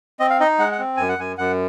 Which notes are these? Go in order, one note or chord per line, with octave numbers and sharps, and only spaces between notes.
C4 D#5
F5
D#4 D#5
G#3 F#5
F#5
C4
F#2 G#5
F#5
F#2 G#5
F#2 F#5